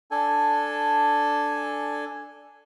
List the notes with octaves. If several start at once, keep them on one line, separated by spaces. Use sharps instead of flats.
D4 A4 G#5